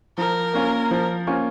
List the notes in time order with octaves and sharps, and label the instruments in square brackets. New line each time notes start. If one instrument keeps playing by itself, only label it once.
[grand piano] F3 [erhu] A#4
[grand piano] A#3 C#4 F4
F3
A#3 C#4 F4